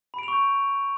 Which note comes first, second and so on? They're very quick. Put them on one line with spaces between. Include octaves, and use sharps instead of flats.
B5 D7 F7 C#6 G6